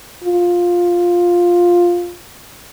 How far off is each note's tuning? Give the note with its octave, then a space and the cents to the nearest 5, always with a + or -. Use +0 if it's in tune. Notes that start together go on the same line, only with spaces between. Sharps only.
F4 +5